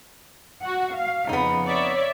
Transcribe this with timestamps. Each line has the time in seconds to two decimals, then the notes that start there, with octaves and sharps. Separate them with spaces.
0.62 F#4 F#5
0.93 F5
1.29 F2 C#3 B3 D#4
1.67 C#5 D5 E5